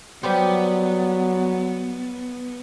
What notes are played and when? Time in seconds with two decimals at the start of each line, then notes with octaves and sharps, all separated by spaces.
0.23 F#3 G3 B3 G4 C5